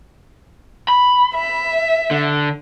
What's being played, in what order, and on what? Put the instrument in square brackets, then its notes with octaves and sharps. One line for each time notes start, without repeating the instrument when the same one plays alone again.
[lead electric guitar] B5
[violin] E5
[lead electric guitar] D3